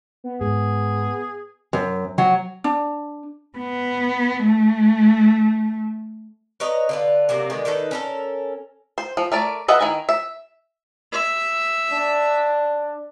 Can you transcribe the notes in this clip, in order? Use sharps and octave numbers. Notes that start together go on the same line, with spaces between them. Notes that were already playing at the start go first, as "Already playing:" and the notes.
B3
G#2 G#4
F#2
F#3
D4
B3
A3
B4 C#5 D#5 A#5
D3 F4 B4
C3 F#3 A#3
D3 D#3 G#3 B3
D#3 D#4 A4 B4
C#4 A4 A#4
C5
F3
A3 A#4 D5
B4 D#5 E5 F#5
D#3 E4 G#5
E5
E5
D4